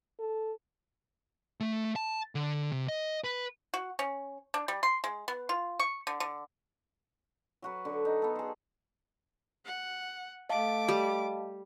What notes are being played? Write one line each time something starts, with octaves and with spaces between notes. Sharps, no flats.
A4
A3
A5
D3
C3
D#5
B4
F#4
C#4
D4
G3
C6
G#3
B3
F4
C#6
D3
D3
F#3 F#4 B4
D3
D#4
B3 A4
G#4 C5
F#5
A3 D#5 F5 A5 D6
G3